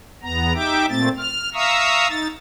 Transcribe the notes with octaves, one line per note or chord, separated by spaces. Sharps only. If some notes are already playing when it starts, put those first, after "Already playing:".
E2 B3 A#5
D#4 G4 E5 G5 D6
A#2 A3 C4 A6
F6
E5 F5 A#5 C#6 D#6 E6
D#4 A6